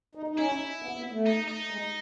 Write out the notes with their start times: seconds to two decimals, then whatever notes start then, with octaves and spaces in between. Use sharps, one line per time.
0.15 D#4
0.28 D#4
0.38 C#4 E4
0.82 B3
0.97 B3
1.12 A3
1.26 D#4
1.48 D#4
1.71 G#3